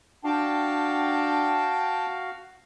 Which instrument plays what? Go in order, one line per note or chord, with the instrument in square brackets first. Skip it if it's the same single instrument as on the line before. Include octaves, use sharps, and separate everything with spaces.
[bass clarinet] D4 [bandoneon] F#4 F5 [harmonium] G5 A5